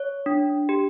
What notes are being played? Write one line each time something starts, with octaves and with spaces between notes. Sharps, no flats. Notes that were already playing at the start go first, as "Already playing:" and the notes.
Already playing: C#5
D4
G4